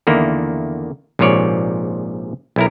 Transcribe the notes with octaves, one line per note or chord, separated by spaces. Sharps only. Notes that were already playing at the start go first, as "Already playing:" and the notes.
E2 D3 D#3 A#3 E4
A#1 G#2 C3 F3 C#5 D5
B1 E4 A#4